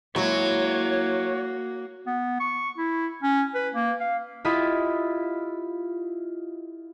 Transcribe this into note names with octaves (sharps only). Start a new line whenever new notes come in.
F#3 G#3 A#3 E4 C#5
B3
C#6
E4
C#4
B4
A#3
F5
E4 F4 G4 D#5 B5